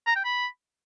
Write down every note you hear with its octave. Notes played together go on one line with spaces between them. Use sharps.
A#5
G5
B5